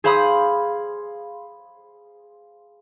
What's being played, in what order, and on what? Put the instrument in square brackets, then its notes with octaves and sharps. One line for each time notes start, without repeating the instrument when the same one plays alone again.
[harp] G#4 C5 F5 B5 C6 D#6